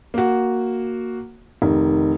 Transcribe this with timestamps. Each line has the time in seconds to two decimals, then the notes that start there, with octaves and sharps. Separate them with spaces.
0.14 A#3 F#4
1.62 F1 D#3